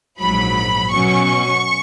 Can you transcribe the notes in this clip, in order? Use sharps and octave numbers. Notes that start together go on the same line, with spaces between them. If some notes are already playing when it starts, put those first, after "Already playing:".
A#1 G#2 F#3 B5
B2 F#3 C#4 C#6